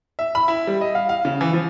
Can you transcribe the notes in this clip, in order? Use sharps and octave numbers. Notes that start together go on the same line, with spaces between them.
E5
B5
E4
G3
D#5
F5
F5
C#3
E3
F3